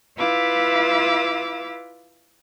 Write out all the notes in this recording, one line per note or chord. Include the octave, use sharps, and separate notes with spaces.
E4 F4 B4 F5 D6 E6